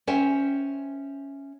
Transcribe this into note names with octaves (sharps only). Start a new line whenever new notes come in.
C#4 C5 E5 G5